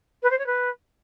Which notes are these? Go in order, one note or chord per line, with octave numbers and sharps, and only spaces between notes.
B4
C5
C#5
B4